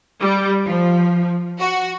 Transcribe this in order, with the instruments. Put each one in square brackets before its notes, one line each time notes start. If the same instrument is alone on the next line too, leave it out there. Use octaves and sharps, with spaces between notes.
[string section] G3
F3
F#4